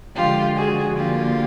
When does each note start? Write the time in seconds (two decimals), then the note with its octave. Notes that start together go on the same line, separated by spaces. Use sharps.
0.15 D3 F3 G#3 F4 G4
0.55 F#4 G#4
0.95 D3 F3 A#3 F4 G4